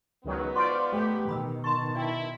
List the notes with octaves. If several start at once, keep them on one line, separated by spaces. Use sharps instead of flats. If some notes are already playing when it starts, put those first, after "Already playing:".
C#2 G#2 D#3 F#3 B3 B4
F4 C5 D5 C6 C#6
A3 G4
B2 D#3 B5 D#6 E6
A5 C6 C#6
E4 D5 G5